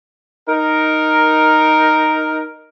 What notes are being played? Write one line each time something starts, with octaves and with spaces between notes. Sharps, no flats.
D#4 A#4